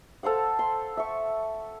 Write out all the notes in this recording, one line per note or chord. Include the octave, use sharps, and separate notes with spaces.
A4 C5 F5 F#5
C6
E5 C#6